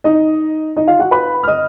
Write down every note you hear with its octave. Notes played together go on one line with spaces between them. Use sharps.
D#4 D#5
D#4 D#5
F4 F5
F#4 F#5
B4 B5
F6
D#5 D#6